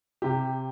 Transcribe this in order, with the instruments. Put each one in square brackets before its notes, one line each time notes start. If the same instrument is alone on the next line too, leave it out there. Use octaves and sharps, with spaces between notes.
[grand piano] C3 G4